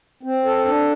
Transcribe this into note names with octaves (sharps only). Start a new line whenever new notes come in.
C4
A4
D4